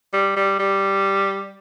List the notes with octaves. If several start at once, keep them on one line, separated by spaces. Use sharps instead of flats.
G3
G3
G3